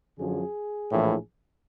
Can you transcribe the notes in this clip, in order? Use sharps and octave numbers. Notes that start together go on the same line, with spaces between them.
F#2 D3 F3 G#4
A#1 A2 E3